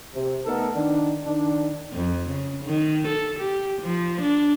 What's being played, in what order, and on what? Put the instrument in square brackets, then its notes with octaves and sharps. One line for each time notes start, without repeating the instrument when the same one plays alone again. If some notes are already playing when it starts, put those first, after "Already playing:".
[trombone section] C3
A3 B3 D#4 A4 A#4
D#3 D4
D#3 D4
[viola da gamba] F2
C#3
D#3
A4
G4
F3
D4